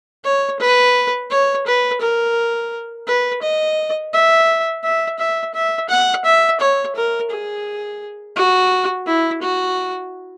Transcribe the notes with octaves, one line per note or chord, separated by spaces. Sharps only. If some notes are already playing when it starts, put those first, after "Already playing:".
C#5
B4
C#5
B4
A#4
B4
D#5
E5
E5
E5
E5
F#5
E5
C#5
A#4
G#4
F#4
E4
F#4